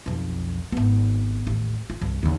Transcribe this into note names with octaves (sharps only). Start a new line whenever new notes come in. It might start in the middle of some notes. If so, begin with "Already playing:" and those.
B1 F2
G#1 B3
A1 D#2
F4
C2 G2
D#2 D3